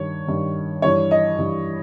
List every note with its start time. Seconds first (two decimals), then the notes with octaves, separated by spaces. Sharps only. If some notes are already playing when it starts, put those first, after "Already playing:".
Already playing: G2 D#3 C#5
0.27 G2 D#3
0.82 G2 E3 C#5
1.11 D#5
1.39 G2 E3